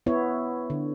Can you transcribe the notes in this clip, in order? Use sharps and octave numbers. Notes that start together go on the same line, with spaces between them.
B3 E4 C#5
D3